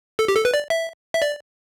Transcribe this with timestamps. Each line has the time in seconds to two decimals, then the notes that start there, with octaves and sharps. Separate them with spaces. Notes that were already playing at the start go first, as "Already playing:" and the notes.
0.19 A4
0.28 G4
0.37 A4
0.45 B4
0.54 D5
0.70 E5
1.14 E5
1.22 D5